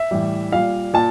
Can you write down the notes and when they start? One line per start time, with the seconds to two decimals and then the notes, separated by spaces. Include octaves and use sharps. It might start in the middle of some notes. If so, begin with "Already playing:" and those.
Already playing: E5
0.11 A2 E3 G3
0.52 A#2 G3 F5
0.94 A#2 A5